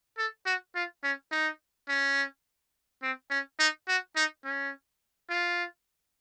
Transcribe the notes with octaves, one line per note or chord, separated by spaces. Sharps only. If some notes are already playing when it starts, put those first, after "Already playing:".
A4
F#4
F4
C#4
D#4
C#4
C4
C#4
D#4
F#4
D#4
C#4
F4